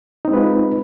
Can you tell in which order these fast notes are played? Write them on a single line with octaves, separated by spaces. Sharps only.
D#4 C4 G#3 B4 F4